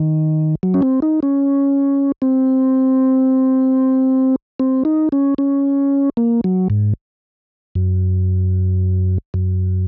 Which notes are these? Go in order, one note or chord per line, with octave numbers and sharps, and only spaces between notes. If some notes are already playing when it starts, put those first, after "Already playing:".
Already playing: D#3
F#3
C#4
C4
D#4
C#4
C4
C4
D#4
C#4
C#4
A#3
F#3
G#2
F#2
F#2